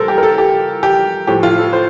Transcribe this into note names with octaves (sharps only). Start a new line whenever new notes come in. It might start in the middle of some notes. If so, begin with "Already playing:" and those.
Already playing: A#2 G3 A4 A#4 C5
G4
A#4
A4
G4
G4
A2 F3 G4
F4
A4
C5